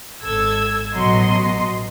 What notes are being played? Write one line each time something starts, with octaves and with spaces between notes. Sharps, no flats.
G#1 A4 E6 G#6
A1 B2 F#3 D#5 C6